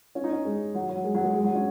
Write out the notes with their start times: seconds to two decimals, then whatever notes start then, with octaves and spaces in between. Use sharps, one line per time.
0.15 C#4
0.24 D#4
0.33 C#4
0.45 G#3
0.75 F#3
0.89 F#3
1.04 G#3
1.15 F#3
1.24 G#3
1.34 G#3
1.44 F#3
1.55 C#4